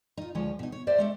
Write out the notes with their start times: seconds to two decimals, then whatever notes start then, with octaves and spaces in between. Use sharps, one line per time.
0.17 D#4 F4
0.35 D2 F3 G#3 C#5
0.59 B2 D#4
0.72 C#5
0.87 G4 C5 D5 E5
0.98 G#3 A3 D4